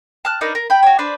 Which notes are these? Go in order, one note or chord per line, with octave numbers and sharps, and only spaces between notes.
A5 F6 F#6
D4 D#4 A#4 B4
A#4
G5 B5
F#4 C#5
D4 B4 C5 D5